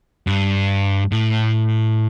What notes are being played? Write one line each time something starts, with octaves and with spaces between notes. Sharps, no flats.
G2
A2